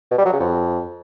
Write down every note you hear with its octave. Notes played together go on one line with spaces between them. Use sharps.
B2
G3
F#3
C#3
F2